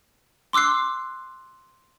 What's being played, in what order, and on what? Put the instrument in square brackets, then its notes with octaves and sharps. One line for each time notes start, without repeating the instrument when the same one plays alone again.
[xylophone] C6 D6 E6 F#6 C7